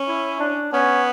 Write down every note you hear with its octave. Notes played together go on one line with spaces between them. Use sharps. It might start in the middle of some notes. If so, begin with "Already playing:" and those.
Already playing: C#4
E4
D4
B3 C#4